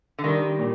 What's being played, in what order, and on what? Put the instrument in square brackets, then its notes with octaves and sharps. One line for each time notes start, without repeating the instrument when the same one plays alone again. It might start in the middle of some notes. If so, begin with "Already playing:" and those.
[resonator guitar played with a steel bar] D3
[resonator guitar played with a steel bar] D#3 [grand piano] G3
[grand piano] A#2